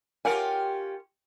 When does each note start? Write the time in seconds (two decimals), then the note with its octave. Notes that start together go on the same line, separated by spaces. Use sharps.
0.25 C#4 F4 G4 A#4 F#5 G#5